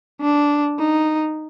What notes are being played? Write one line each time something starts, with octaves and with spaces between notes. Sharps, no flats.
D4
D#4